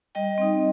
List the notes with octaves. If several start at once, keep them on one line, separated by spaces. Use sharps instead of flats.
G3 D#5 G5
C4 D#4